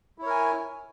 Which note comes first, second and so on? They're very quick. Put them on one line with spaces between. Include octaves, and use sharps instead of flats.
E4 C#5 A#4 G#5